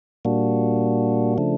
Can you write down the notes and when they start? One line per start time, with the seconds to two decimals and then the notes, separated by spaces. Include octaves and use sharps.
0.25 A#2 G3 A#3 D4 F#4
1.38 C#3 F3 A3 D4